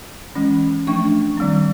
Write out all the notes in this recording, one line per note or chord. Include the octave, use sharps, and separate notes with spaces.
E3 G#3 C#4
F3 A3 D4 C#6
D#3 G3 C4